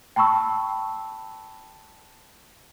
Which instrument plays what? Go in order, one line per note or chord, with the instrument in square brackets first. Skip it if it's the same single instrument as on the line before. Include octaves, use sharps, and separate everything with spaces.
[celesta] G5 A5 B5 C#6 E6